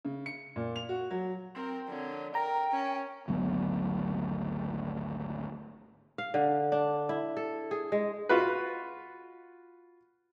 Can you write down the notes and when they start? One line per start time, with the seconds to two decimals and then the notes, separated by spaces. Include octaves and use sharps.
0.05 C#3
0.26 C#7
0.56 A#2
0.76 F7
0.89 F#4
1.11 F#3
1.56 C4 A#4
1.88 D3 F3 C#5
2.35 A#4 G5 A#5
2.72 C#4
3.28 G#1 D2 F#3 B3
6.18 F5
6.34 D3
6.72 D4
7.09 E4
7.37 A4
7.71 G#4
7.92 G#3
8.29 F4 F#4 B4